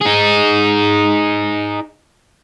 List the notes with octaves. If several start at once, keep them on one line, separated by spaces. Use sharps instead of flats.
D#4 G#4